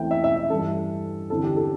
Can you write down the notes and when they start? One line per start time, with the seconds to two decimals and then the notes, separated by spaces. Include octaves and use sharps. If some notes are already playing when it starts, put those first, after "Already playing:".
Already playing: E2 E3 A3 C4 E4 E5 G5
0.11 E5
0.24 E5
0.37 E5
0.50 G2 E3 G3 A4
1.30 E2 D3 C4 E4 A4
1.43 G4
1.56 A4